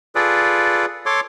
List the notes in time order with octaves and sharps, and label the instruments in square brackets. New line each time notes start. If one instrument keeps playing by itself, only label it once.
[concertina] F4 G#4 A4 B4 D5
A4 C#5 C6 D6